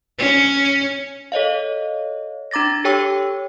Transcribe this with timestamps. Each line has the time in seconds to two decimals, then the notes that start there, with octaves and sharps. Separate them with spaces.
0.18 C#4
1.32 A4 C#5 D#5 F5
2.51 D4 A#5 D6 A6 A#6
2.84 G4 A4 C#5 G5 C#6 E6